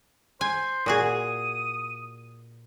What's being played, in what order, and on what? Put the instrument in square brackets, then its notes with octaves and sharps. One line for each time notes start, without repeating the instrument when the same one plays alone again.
[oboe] C5 [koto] G#5
[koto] A#2 F#4 G#4 [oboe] D#6